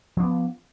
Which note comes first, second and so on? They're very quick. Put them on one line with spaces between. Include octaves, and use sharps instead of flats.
F3 D4 B3